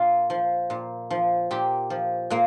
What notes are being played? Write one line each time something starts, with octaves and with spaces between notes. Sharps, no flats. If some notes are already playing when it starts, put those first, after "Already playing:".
Already playing: A#2 F4
F3
A#2
F3
A#2 G4
F3
A#2 A#3